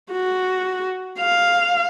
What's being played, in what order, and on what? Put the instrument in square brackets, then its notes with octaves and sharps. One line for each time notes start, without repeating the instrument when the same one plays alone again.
[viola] F#4
F5